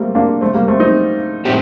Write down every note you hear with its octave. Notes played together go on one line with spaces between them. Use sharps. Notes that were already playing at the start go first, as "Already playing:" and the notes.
Already playing: G3 A3 A#3 C4
A#3 D4
A3 C4
G3 A#3
A3 C4
C4 D#4
A2 A3 C4 G4 C5